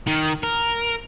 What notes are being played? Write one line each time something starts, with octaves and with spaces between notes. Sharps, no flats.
D#3
A#4